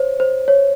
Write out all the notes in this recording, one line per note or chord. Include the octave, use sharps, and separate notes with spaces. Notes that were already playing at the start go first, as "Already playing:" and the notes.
Already playing: C5 C#5
C5
C#5